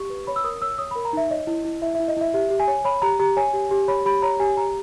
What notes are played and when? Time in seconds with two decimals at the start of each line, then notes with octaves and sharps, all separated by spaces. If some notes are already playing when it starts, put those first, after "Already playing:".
Already playing: G4 C#6
0.10 B4
0.27 C#5 B5
0.36 E6
0.44 A#4 D#6
0.62 C#5 E6
0.78 C#5 D#6
0.91 A#4 B5
1.05 A#5
1.13 D#4 E5
1.31 C#5 D#5
1.47 E4
1.65 E4
1.82 E4 E5
1.95 E4 E5
2.08 D#5
2.17 E4 E5
2.34 G4 E5
2.51 G4
2.60 G#5
2.68 C#5
2.85 C#5 B5
3.02 G4 A#5
3.20 G4 A#5
3.37 C#5 G#5
3.53 G4
3.71 G4
3.88 C#5 B5
4.05 G4 B5
4.22 C#5 A#5
4.40 G4 G#5
4.57 G4 A#5